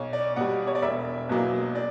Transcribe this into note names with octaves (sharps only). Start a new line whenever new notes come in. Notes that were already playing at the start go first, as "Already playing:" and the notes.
Already playing: B1 C#5
D5
B2 G3 F#5
C#5
D5
E1 E5
E2 B2 F#3 A#3
D5